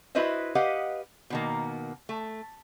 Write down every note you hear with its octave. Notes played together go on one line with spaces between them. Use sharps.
E4 F#4 B4 C5 D#5 E5
G4 B4 D#5 F5 F#5
B2 D#3 A#3
A3